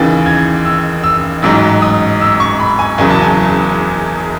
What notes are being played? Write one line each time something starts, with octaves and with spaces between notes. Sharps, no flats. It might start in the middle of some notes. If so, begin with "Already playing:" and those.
Already playing: D#2 C#3 E3 A6
G#6
E6
E6
A1 G#2 F#3 E6
D#6
E6
C#6
B5
G#5
F#1 E2 C#3 F#3 G#5
A5
G#5